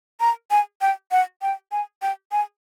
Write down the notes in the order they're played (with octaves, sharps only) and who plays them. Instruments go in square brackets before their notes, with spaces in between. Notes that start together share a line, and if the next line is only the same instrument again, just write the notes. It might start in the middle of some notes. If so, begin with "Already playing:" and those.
[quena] A#5
G#5
G5
F#5
G5
G#5
G5
G#5